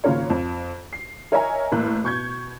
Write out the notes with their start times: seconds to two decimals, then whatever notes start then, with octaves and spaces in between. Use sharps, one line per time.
0.04 G#1 C#3 A#3 F4 A#4 C#5
0.30 F2
0.93 C7
1.32 A#4 C#5 D#5 E5 G#5 A#5
1.72 A1 A2 A#3 F#6
2.04 B2 C#6 G6 G#6